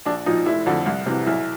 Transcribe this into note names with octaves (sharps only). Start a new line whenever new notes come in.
A#1 D4
A#2 F3 D#4
F1 E4
F2 D3 F3
C2
C3 E3
B1 E4